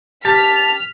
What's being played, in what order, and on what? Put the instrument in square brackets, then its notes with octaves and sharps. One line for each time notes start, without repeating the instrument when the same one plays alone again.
[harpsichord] G4 [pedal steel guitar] A5 [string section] F6 B6